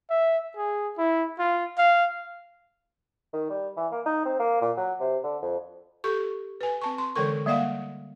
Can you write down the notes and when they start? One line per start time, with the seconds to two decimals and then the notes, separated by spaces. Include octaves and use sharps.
0.10 E5
0.57 G#4
0.98 E4
1.39 F4
1.79 F5
3.33 D#3
3.50 G3
3.77 E3
3.92 A#3
4.06 D#4
4.25 C4
4.39 A#3
4.61 A#2
4.77 F#3
5.00 C3
5.24 D3
5.42 F2
6.04 G4 A4 C#6
6.61 B4 G#5
6.82 C4 A5 C#6
6.98 C6
7.16 D3 E3 G#3 A4 A#4 C#6
7.46 G3 A#3 D5 D#5 F5 F#5